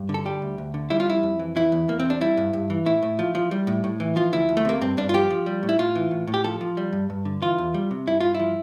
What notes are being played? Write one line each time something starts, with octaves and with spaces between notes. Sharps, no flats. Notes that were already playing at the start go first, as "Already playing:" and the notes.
Already playing: G2
D3
A4
G3 G4
D2
D2
D3
G3 E4
F4
F2 E4
F2
E3
E3 E4
E2
E2 A#3
C4
C3 D4
G3 E4
G2
G2
E3
A2 E4
A2
F3
F3
G3
A2
A2
E3
F3 F4
D2 E4
D2
A3
C3 A#3
G2 C4
G2 D4
F4
F3 G4
F3
G3
A2
E4
A2 F4
E3
A2
A2
G4
F3 A4
F3
G3
G2
G2
D3
E3 F4
E2
G3
C3
G2 E4
G2 F4
E4
F3